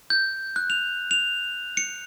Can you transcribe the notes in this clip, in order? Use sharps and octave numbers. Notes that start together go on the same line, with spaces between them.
G6
F#6
F7
F7
C#7